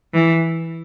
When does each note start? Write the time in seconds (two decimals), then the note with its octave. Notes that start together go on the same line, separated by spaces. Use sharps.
0.14 E3